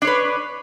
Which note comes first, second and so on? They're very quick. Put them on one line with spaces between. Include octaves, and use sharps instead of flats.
D4 C#5 B4